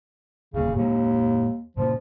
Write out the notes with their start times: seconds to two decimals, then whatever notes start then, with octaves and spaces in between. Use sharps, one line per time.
0.54 D#1 E2 C#3 A#3
0.75 D#2 A#2 G#3
1.77 A#2 C#3 F3 A#3